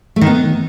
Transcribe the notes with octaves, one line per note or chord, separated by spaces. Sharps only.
A3
D#3
B3